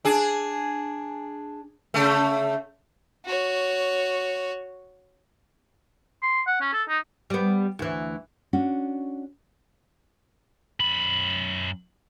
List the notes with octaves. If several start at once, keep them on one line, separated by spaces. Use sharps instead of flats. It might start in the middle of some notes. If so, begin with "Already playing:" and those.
D4 G#4
C#3 A3
F#4 C#5
C6
F#5
C#4
A4
D#4
G3 B3
D2 E3
C#4 D4 F#4
F#2 B5